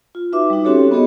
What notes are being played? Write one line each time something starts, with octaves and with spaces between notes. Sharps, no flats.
F4
D#4 F#4 B4 E5 D6
G3 D#4
C4 C#4 F#4 G4 A4 C#5
B3 D#4 F#4 G#4 C#5 D#5